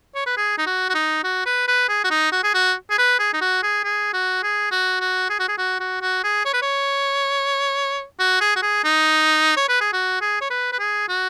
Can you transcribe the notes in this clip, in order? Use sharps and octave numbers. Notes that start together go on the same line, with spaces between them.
C#5
B4
G#4
D#4
F#4
F#4
D#4
F#4
B4
B4
G#4
F#4
D#4
F#4
G#4
F#4
G#4
B4
G#4
D#4
F#4
G#4
G#4
F#4
G#4
F#4
F#4
G#4
F#4
G#4
F#4
F#4
F#4
G#4
C#5
B4
C#5
F#4
G#4
F#4
G#4
D#4
C#5
B4
G#4
F#4
G#4
C#5
B4
B4
G#4
F#4